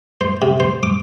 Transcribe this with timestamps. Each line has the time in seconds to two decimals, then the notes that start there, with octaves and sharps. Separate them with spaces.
0.21 C5
0.42 C3
0.60 C5
0.83 D6